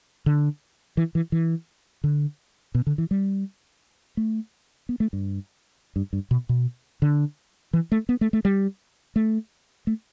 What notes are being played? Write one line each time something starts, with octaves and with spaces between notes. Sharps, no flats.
D3
E3
E3
E3
D3
B2
D3
E3
G3
A3
B3
A3
G2
G2
G2
B2
B2
D3
E3
A3
B3
A3
A3
G3
A3
A3